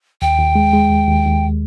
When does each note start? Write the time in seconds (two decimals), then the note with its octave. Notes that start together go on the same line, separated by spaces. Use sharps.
0.22 D#2 G5
0.38 D#2
0.55 G#3
0.73 G#3
0.91 D#2
1.07 D#2
1.25 D#2